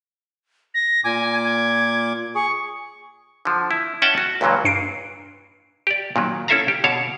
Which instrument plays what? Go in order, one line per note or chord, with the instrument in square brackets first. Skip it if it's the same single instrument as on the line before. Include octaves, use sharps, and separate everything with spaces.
[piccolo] A#6
[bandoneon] A#2 D6 [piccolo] G#5
[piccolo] G#6
[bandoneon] G#4 [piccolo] C#6
[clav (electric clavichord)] D3 F3
E4
C#4 D#5 E5 F#5 G5 A5
F#4
C#2 G2 A#2 E3 F#3 A#3
[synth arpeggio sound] G2 C7 D7
[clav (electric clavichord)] G4 D5
A#2 D#3 F#3
C#4 E4 A4 E5 F5 A#5
G4
B2 D3 C#5 F5 A5